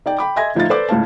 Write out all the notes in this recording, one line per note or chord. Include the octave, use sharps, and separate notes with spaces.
D#4 D5 G5
G5 B5 D6
D#5 E5 G#5 C6 G#6 A#6
A2 F3 D#4 E4 F5 A6
A4 B4 C5 D5 D6
C#2 A2 F5 A5